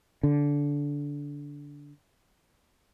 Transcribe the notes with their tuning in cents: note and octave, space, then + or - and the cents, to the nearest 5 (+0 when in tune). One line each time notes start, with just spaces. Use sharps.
D3 -20